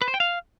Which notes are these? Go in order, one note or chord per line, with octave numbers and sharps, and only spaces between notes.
B4
C5
G5
F5